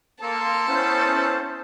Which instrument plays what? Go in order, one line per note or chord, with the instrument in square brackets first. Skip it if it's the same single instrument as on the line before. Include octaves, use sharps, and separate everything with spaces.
[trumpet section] A#3 C6 [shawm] A4 [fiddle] A5
[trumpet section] B3 E4 [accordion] C#4 C5